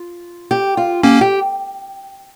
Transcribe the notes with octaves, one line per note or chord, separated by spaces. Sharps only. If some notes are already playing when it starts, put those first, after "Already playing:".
Already playing: F4
G4
F4
A#3 C#4 G4
G4